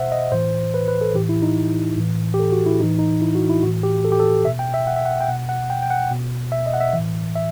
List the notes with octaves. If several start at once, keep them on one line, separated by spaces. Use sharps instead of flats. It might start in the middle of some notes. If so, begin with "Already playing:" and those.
Already playing: B2 C5 E5 F#5
D#5
A2 E3 C5
B4
B4
A4
A2 E3 G4
E4
D#4
A2 E3
G4
A4
F#4
E4
A2 E3 D#4
D#4
E4
F#4
E4
A2 E3 F#4
G4
A4
G4
A4
B2 E5
G5
E5
F#5
E5
F#5
G5
B2 F#5
F#5
G5
G5
F#5
B2
E5
D#5
F#5
E5
E3
A2
E5